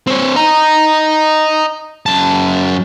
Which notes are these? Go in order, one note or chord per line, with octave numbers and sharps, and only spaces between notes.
C4 C#5
D#5 A#5
F#2 A5